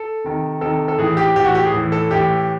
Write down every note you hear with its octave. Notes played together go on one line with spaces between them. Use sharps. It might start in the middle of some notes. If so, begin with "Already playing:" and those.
Already playing: A4
C3 D#3
C3 D#3 A4
A4
A2 E3 G#4
G4
A2 E3 G4
F#4
G4
G#4
A2 E3
A4
A2 E3 G4